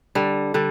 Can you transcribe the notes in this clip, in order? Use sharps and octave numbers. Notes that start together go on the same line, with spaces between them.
D3 G3
D3 G3